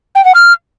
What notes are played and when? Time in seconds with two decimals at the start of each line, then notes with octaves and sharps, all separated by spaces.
0.15 G5
0.25 F#5
0.35 F6